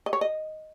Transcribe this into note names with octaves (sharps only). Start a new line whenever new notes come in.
D#5
C#5
D#5